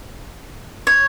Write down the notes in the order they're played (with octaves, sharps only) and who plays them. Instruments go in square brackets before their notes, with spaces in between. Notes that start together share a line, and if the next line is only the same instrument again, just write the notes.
[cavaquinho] C#5